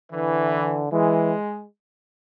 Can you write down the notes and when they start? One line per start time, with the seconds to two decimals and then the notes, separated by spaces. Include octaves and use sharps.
0.12 D3 E3
0.92 E3 G#3